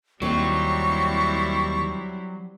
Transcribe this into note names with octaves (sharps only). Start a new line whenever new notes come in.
D#2 F#3 G3 C4 E4 C#6